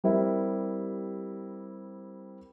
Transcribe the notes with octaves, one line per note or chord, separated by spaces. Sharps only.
G3 C4 E4 G4 A#4